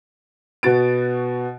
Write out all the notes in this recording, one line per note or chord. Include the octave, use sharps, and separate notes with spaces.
B2 B3 F#4 A6 D7